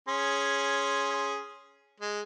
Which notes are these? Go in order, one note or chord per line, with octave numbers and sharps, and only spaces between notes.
C#4 G#4 C6
G#3